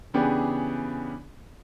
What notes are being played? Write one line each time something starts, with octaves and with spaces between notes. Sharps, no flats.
C#3 E3 B3 D4 G4 G#4